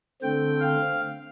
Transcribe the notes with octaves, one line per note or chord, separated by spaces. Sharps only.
D3 A3 C4 G5
F5